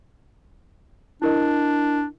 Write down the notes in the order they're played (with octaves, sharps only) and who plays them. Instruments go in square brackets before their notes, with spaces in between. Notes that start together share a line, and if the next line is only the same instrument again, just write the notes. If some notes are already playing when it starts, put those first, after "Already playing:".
[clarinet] D4 [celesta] E4 A#4 D#5